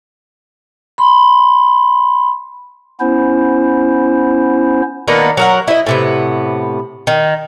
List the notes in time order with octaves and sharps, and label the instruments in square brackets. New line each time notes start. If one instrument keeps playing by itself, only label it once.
[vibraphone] B5 C6
[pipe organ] B3 C#4 E4 C5
[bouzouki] D#3 A#3 B3 D4
F#3 A#4 F#5
E4 D#5
A2 C3 B3
D#3